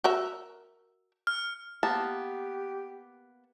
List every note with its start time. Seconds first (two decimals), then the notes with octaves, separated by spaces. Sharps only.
0.04 F#4 A#4 E5
1.27 F6
1.83 A#3 B3 G4 A5